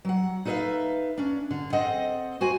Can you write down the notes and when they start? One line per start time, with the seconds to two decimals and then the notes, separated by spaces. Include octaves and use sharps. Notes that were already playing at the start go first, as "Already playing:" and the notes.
0.05 F#3 F#5
0.45 D#4 A4 B4 C5 E5 F5
1.18 C#4 D4
1.51 D3
1.73 C4 A4 C5 D#5 F#5
2.41 F#4 C5 G#5